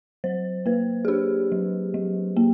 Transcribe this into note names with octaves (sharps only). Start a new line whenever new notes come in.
F#3 C5
A#3 B4
G#4
D4 G4
F#3
F#3
A#3